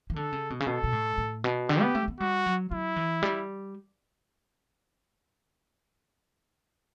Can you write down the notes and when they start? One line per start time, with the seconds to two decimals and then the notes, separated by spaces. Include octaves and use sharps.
0.10 E3
0.16 D3 A4
0.33 C#3
0.50 B2
0.60 C#3
0.67 B2 A4
0.84 B2
0.93 A2
1.18 A2
1.44 B2
1.69 D3 G4
1.81 B3
1.95 A3
2.08 B3
2.20 G3 F#4
2.46 F#3
2.71 F#3 E4
2.96 E3
3.23 G3